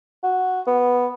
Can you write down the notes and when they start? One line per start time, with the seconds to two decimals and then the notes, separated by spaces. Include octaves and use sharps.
0.24 F#4
0.67 B3